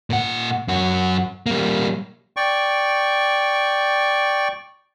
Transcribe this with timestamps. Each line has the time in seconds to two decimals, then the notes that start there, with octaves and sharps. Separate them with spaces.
0.10 A#2 F#5
0.68 F#2 F#4
1.46 G3 A#3
2.36 D5 G5 C#6